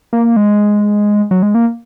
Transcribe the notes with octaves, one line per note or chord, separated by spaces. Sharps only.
A#3
G#3
F#3
G#3
A#3